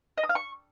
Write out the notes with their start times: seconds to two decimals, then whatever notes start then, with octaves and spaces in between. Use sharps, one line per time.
0.18 D#5
0.23 D#6
0.29 F5
0.35 C#6